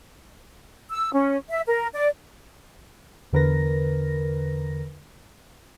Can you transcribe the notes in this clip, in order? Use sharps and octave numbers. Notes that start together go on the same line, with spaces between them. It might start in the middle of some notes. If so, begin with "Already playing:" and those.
E6
C#4
E5
A#4
D5
E2 D3 A#4 B4 A#6